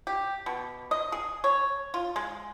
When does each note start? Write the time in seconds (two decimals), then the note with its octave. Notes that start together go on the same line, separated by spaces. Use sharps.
0.07 G4
0.46 B2
0.91 D#5
1.12 G#4
1.44 C#5
1.94 F4
2.16 G#3